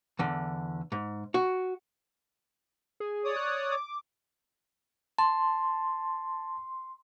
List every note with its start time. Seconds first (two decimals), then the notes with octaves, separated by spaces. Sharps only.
0.19 E2 D3
0.92 G#2
1.34 F#4
3.00 G#4
3.25 C#5 D5 D#6
3.36 F#6
3.72 D6
5.18 A5 C6